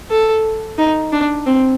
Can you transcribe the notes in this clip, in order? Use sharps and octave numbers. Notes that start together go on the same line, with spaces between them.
A4
D#4
D4
C4